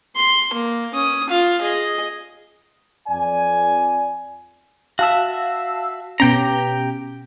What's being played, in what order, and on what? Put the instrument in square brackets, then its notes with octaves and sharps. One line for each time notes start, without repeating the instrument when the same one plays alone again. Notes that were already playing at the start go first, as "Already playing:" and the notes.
[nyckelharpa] C6
A#3
C#4 D#6
F4 F5
G#4 D#5
[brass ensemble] F2 D5 G#5
[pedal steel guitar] F#4 E5 [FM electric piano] F5 A5 E6
[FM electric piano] B2 B3 C#4 [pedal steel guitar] G4 G5 A#5